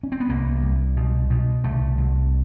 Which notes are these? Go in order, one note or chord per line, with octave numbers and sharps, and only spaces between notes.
C#4
C4
B3
C2 A#3
C2
B2
B2
C2 A3
C2